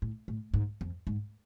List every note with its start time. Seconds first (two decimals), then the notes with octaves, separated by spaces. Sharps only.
0.02 A2
0.28 A2
0.54 G#2
0.81 F2
1.07 G#2